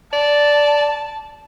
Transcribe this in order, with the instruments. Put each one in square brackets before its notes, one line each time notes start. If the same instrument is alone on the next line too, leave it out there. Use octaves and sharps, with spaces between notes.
[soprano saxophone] D5 [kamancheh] A5